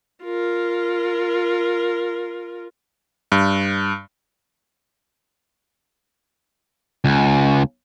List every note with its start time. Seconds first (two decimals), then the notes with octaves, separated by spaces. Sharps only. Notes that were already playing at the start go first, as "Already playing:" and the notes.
0.24 F4 A#4
3.32 G2
7.04 C#2